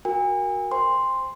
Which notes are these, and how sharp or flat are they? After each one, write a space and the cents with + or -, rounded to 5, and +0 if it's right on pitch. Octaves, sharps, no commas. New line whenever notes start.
F#4 +0 A#4 +0 G#5 -40
C5 +0 G5 +45 C6 +0